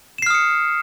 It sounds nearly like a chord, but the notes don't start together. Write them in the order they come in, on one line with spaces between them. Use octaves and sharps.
E7 C7 F6 D#6 C#7